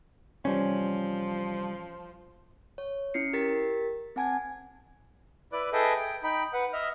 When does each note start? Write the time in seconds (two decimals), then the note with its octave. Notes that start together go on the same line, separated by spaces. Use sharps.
0.45 C3 E3 F3 G3 C#4
2.78 C#5
3.14 C#4 E4 C7 C#7
3.33 G4 A#4 A6 B6
4.16 C4 F#5 G#5 A5 G#6
5.52 E4 B4 D5 D6 F#6
5.73 G#4 A4 B4 D#5 E5 G5
5.97 G5
6.23 D#4 G5 B5
6.53 B4 F#5
6.73 D#5 E5 F6